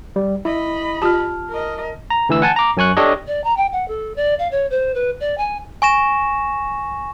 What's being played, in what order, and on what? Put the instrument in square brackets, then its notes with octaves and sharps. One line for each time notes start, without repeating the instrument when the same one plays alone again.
[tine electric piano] G3
[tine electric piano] E4 [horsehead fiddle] D#5 B5
[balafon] F4 G4 [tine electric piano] A5 F6
[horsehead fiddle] A#4 D#5
[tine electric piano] A#5
D3 E3 A3 E6
F#5 G#5 A5
A#5 D6
F#2 C#4 G#5 C#6 F#6
D4 G4 A4 C#5 D#5
[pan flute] D5
A#5
G5
F#5
A4
D5
F5
C#5
C5
B4
D5
G#5
[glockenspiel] G#5 C#6 A#6 E7